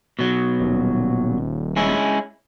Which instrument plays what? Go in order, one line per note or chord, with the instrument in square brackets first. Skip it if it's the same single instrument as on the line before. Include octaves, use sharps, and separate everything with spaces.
[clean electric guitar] B2 F#3
[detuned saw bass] D#1
[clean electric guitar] G#3 C#4 E4